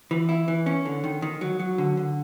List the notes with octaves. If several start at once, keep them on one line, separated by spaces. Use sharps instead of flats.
E3
E4
E3
C#4
D3
D#3
D#3
F#3
F#3
D3
D3